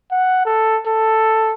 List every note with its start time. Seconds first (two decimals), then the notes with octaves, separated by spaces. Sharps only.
0.12 F#5
0.45 A4
0.86 A4